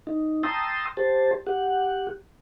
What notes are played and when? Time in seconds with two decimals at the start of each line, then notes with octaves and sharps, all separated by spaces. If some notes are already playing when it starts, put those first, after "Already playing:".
0.07 D#4
0.43 G5 A5 A#5 C6 D#6 E6
0.97 G4 C5 A5
1.47 G4 F#5